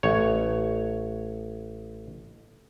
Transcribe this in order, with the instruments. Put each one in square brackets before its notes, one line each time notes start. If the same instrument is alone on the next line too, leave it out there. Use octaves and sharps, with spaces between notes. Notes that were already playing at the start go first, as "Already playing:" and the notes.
[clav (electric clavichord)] A1 C#5